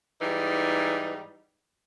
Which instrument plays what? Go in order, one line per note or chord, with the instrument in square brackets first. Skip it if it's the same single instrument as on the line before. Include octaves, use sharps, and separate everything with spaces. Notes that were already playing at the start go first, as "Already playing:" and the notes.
[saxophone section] G#2 E3 G3 D#4